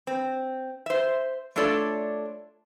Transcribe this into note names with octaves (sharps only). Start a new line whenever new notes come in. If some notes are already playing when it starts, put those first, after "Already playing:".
C4
C5 E5
A3 D4 F4 A4 C#5 D5